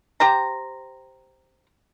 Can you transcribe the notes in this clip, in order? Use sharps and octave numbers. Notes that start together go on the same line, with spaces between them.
G4 C5 A#5